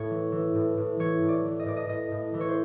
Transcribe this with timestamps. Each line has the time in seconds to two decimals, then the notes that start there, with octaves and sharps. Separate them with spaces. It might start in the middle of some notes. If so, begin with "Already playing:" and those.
Already playing: A2 C#5
0.10 E3
0.32 E3
0.55 A2
0.77 A2
0.99 E3 C#5
1.21 A2
1.29 D5
1.45 E3
1.59 D#5
1.66 A2 D5
1.76 D#5
1.89 A2 D#5
2.11 A2
2.34 E3
2.40 C#5
2.49 C5